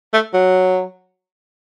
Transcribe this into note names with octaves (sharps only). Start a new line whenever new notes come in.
A3
F#3